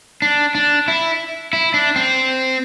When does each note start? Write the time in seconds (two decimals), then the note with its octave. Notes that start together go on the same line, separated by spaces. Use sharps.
0.22 D4
0.55 D4
0.88 E4
1.53 E4
1.74 D4
1.96 C4